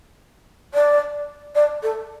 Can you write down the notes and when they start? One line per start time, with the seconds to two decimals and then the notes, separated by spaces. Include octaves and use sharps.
0.74 D5
1.55 D5
1.83 A4